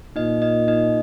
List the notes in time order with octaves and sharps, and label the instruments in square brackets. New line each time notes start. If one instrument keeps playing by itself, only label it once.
[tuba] A#2 [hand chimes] D#4 D#5
[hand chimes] D#4 D#5
D#4 D#5